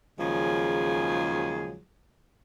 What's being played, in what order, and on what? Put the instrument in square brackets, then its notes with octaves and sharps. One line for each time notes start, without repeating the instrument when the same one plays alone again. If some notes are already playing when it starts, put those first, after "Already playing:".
[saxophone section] D#2 C#3 F3 F#3 G#3 G#4